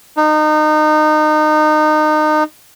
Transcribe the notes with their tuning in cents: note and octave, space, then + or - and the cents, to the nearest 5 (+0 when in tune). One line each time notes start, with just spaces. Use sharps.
D#4 -25